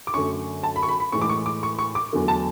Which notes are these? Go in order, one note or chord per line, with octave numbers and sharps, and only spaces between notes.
D6
F#2 D3 A3 C#6
A5
B5
C#6
B5
B5
A2 E3 G#3 C#6
D6
C#6
D6
C#6
C#6
D6
E2 D3 F#3 A3
A5